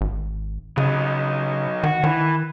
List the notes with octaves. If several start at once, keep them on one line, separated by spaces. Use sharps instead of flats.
G#1
C#3 F#3 D#4
D#3 F#4
D#3 E3